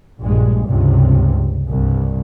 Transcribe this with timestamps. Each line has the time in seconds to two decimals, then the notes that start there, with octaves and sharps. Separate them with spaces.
0.20 A#1 G2 G#3
0.66 C#2 G2 C3
1.68 C2 G2